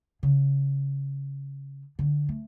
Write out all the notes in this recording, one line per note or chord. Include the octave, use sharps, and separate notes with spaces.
C#3
D3
A3